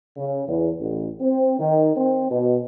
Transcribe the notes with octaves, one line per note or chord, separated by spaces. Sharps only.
C#3
E2
A1
C4
D#3
C4
B2